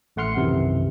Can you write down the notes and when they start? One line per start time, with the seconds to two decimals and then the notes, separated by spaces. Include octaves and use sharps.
0.16 A1 A3 F#5 C6 F6 C#7
0.36 B1 F#2 C3 D#3 E3